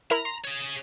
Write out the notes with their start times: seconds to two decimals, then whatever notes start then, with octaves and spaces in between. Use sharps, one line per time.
0.11 E4 A#4 A#5 B5
0.25 C6
0.44 G#4 C#5